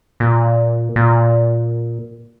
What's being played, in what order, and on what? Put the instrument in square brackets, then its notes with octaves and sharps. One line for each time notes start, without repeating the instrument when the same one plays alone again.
[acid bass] A#2
A#2